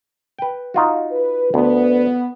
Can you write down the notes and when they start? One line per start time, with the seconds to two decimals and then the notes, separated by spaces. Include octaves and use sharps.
0.39 B4 G5
0.74 D#4 F4 F#4
1.12 B4
1.54 D2 B3